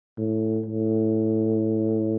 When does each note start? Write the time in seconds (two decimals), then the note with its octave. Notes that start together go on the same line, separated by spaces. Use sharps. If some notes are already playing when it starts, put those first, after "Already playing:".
0.18 A2
0.66 A2